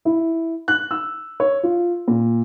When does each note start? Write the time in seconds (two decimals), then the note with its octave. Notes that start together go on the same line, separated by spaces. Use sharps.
0.05 E4
0.68 F#6
0.91 E6
1.40 C#5
1.63 F4
2.08 A#2